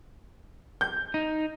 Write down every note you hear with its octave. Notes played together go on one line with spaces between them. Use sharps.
G6
D#4